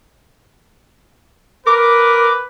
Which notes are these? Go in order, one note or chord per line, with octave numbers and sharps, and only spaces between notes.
A#4 B4 D6